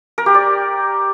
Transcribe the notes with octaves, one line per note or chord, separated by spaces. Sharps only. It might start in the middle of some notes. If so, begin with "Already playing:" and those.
A#4
G4
D5